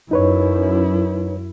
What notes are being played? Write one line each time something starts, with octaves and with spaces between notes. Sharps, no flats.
F#2 D#4 E4 B4 C#5